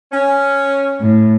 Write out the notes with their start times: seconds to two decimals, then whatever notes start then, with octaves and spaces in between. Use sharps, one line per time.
0.12 C#4
1.00 A2